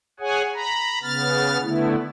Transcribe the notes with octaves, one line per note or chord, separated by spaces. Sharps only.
G#4 C#5 F#5 G#5
A#5 B5
C#3 B3 F6 A6
D3 A3 B3 E4